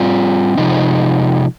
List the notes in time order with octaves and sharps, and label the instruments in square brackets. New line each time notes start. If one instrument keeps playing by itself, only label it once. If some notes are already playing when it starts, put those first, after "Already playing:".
Already playing: [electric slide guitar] G3 C4 F4
C3 F3 G#3 D#4